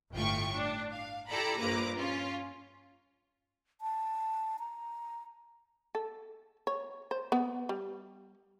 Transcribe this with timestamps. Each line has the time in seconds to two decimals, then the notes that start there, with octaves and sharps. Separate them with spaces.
0.12 G1 A2 F4 G5 C#6
0.55 D4
0.91 F5
1.28 E4 G4 A4 D5 A#5 B5
1.59 A#1 G2 A#3 B4 A#5 D6
1.96 C#4 F4
3.81 A5
4.59 A#5
5.95 A4
6.67 C#5
7.11 C5
7.32 B3
7.69 G3